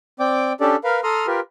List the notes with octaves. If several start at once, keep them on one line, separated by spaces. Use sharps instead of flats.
C4 D5 G5 D6
C#4 D4 G4 A4 D5
A#4 B4 F5
A4 A#5 C6 D#6 F6
F4 G4 A#4 B4